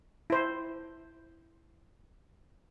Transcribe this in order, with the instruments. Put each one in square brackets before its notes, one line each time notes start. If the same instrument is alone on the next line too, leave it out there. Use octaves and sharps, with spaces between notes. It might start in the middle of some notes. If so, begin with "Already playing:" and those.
[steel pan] E4 C5